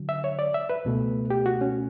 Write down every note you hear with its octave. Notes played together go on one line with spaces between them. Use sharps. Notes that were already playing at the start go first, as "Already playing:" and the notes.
Already playing: D3 F#3
E5
C#5
D5
E5
B4
C#2 B2 A3
G4
F#4
C#4